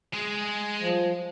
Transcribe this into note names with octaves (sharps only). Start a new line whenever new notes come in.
G#3 G#4
F3